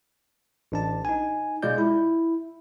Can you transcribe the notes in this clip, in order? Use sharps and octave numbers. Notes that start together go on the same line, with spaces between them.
A1 D4 A5
D#4 G#5
B2 G#3 F4 D5 G6
E4